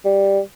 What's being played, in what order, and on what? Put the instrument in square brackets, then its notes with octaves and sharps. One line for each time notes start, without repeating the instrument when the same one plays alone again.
[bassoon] G3